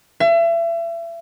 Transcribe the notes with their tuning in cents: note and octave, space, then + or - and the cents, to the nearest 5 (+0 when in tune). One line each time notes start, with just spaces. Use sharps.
E5 +35